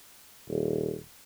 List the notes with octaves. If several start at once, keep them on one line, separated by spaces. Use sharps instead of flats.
D#1